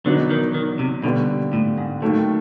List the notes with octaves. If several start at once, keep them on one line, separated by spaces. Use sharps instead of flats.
E2 B2 D3 F#3 B3 D#4
D#3
D#3
C3
D#2 B2 D3 G3 B3
A2
G#2
D#2 A2 D#3 F#3 A3